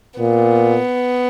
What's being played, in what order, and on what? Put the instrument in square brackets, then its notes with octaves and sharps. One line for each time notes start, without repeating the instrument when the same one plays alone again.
[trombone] A#2 [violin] B3